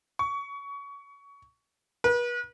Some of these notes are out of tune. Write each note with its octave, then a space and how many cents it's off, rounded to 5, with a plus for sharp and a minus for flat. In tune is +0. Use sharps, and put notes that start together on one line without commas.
C#6 +25
B4 -40